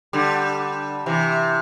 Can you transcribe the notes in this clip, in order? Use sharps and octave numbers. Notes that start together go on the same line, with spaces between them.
D3 G3
C3 E3